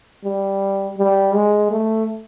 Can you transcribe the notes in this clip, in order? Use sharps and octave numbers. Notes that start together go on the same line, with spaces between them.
G3
G3
G#3
A3